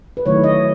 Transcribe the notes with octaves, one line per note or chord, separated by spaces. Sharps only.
B4
D#3 F#3 A3 E4 C#5
D#5